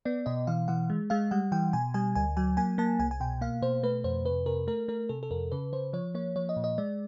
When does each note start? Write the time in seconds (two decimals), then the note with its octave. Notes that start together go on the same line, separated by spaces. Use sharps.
0.05 B3 D5
0.26 B2 D#5
0.47 E3 F5
0.68 E3 F#5
0.90 G#3
1.10 G#3 F5
1.31 G3 F#5
1.52 E3 G5
1.73 B2 G#5
1.94 G3 G#5
2.15 D2 G#5
2.37 F#3 G#5
2.57 A#3 G#5
2.78 A#3 A5
2.99 C2 G#5
3.11 G#5
3.20 B2 G5
3.41 A#3 F5
3.62 B2 C5
3.83 A3 B4
4.04 F2 C5
4.25 C3 B4
4.46 C3 A#4
4.67 A3 A#4
4.88 A3 A#4
5.09 C3 A4
5.23 A4
5.31 F2 A#4
5.52 C#3 B4
5.73 C#3 C5
5.93 F3 C#5
6.15 A#3 C#5
6.36 F3 C#5
6.49 D#5
6.57 A#2
6.64 D#5
6.78 G#3 D5